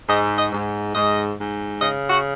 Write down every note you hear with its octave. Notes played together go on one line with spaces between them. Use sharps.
G#2 D#5
D#5
G#2
G#2 D#5
G#2
C#3 D#5
F#4